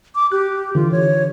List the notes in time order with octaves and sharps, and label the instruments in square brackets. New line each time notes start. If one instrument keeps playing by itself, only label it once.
[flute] D6
[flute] G4 [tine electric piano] F#6
[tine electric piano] D3 E3 [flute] F4
[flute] C#5